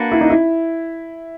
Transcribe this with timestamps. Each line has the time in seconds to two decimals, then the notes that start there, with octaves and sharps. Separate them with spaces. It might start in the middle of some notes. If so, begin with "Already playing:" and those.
Already playing: A#3 D4 F#4 B4
0.12 E4
0.21 D#4
0.30 E4